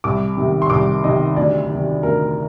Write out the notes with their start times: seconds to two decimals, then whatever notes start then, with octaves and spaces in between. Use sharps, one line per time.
0.04 C2 D6
0.37 C3 D#3
0.62 C6
0.70 C2 D6
1.04 C3 D#3 D#5
1.36 D2 D5
1.70 C3 D#3
2.03 D2 A#4